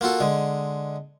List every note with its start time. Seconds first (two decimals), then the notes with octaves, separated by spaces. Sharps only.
0.01 A#3 F4 F#4 A4
0.20 D3 G#3